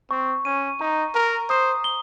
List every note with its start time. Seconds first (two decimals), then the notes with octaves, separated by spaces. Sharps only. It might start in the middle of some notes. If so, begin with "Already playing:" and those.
0.11 C4 C#6
0.45 C#4 D#7
0.80 D#4 A#5
1.15 A#4 A#5
1.50 C5 D#6
1.84 G7